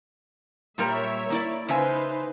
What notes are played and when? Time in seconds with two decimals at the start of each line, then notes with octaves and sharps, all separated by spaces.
0.78 A#2 G3 A#4 C#5 E5
1.30 A#3 E4 D5
1.69 C#3 D#4 B4 C5 E5 G#5